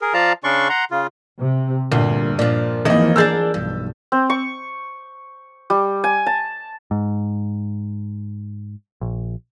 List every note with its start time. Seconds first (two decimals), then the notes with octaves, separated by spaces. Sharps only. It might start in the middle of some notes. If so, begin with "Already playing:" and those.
0.01 G#4 A#4
0.14 F3 F4 D5 F5 A5 A#5
0.44 C#3 C#4 D4 D5 C6 C#6
0.69 F#5 A#5 C6
0.91 C#3 F4
1.40 C3
1.92 D2 G2 A#2
2.39 A#2 F3 D4
2.85 G#1 E2 E3 F3 A#3 D#4 E4 D#5
3.16 D4 G#4 A#4 E6 G6 A6
3.54 B1 G2
4.12 C4
4.30 C#6
5.70 G3
6.04 G#5
6.26 A5
6.91 G#2
9.01 A#1